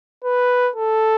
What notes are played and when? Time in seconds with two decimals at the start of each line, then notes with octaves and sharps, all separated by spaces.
0.24 B4
0.76 A4